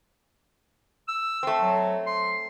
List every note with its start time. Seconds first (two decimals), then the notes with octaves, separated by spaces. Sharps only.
1.08 E6
1.43 A3 C4
1.60 F#3
2.07 C6